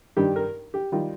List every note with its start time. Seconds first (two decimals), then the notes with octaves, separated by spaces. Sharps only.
0.17 G2 D#3 G3 G4
0.36 A#4
0.74 G4
0.92 D#3 G3 F4